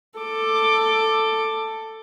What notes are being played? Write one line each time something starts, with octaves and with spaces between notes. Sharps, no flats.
A4 D6